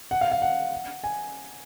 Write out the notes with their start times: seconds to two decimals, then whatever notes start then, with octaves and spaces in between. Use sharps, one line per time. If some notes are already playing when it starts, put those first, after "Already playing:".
0.11 F#5
0.21 F5
0.32 F5
0.42 F#5
1.04 G#5